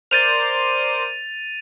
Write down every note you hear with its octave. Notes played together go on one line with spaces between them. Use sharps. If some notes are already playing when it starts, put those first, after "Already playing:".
A#4 C5 D5 A6 D#7 F7